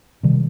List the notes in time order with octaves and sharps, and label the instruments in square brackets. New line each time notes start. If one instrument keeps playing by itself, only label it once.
[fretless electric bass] C3 D#3 G3